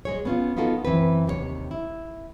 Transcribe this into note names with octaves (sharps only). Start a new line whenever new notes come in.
G#3 G#4 C#5
B3 C#4 F4
B3 D#4 F4 F#4 A4 A#4
F#2 E3 C4 B4
D#2 C3 G4 C#5
E4